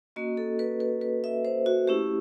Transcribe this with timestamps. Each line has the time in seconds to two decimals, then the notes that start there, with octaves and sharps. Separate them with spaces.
0.16 A#3 C#4 F#4 D#5
0.37 A4
0.59 B4
0.80 B4
1.01 B4
1.24 E5
1.45 C5
1.66 F#4
1.87 A3 C#4 E4 G4